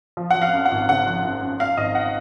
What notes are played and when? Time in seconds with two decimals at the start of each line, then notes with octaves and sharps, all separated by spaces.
0.17 F3
0.31 F3 F#5
0.42 F5
0.53 F#2
0.65 F#5
0.71 G#1
0.89 C#3 F#5
1.07 F3
1.24 F#2
1.42 F#2
1.59 F#2 F5
1.77 G#1 D#5
1.95 F#5